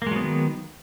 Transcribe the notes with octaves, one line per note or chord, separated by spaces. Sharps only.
D#3 F#3 G#3 A#3 B3